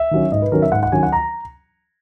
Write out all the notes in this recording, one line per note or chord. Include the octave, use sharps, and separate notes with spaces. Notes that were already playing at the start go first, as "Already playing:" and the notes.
Already playing: E5
D#3 F#3 C#4
G#2 D#5
B4
D#3 F#3 C#4 A#4
E5
G#2 F#5
F#5
D#3 F#3 C#4 G#5
F#5
A#5